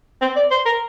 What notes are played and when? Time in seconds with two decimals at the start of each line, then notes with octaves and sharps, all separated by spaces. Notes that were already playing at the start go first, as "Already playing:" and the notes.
0.21 C4
0.36 D5
0.51 C5
0.65 A#4